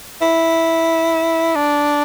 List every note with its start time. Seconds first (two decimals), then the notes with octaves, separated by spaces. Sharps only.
0.22 E4
1.56 D4